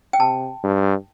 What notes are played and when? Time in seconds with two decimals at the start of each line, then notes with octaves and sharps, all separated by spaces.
0.13 G5
0.20 C3 A5
0.64 G2